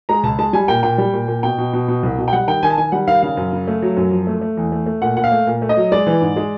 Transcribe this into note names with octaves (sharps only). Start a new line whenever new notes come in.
G#3 A#5
C#2 A5
G#3 A5
G3 G#5
A#2 G5
A#2 G5
G3
A#2
A#2
B2 G5
B2
B2
B2
C2
B2
G5
G3 F#5
D#3 G5
D#3 G#5
A5
D#3 G#5
G3 F#5
D#3 F5
C#3 F5
F#2
C#3
A3
F#3
F#2
F3
A3
A3
E2
A3
A3
A#2 F#5
A#2 F#5
F5
A3
A#2
A3
D#5
F#3
G#3 D5
E3
G#2
G#3